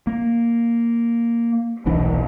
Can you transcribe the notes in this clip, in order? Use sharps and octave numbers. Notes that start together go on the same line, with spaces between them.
A#3
D#1 B1 E3 D4